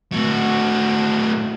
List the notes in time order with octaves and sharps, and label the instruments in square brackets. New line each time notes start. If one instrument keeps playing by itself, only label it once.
[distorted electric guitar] A2 F#4